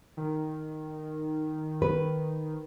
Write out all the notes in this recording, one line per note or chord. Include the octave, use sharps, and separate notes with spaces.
D#3
B4